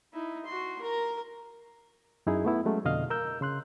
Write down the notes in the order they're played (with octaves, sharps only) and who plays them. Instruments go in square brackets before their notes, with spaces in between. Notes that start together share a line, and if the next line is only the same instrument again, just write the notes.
[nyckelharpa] D#4 E4
F#4 C6
A#4 A#5
[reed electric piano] F#2 D#4 E4 G#4
A3 B3 E4
F#3 G#3 A3 C#4
F2 B2 D3 D#5 F5 F6
A#4 E6 G6
C#3 C6 F#6